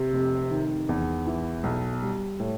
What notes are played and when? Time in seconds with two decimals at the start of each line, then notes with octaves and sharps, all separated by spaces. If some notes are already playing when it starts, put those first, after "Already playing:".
Already playing: C3
0.13 F1
0.51 D#3
0.89 E2
1.27 E3
1.63 B1
2.02 G3
2.40 A2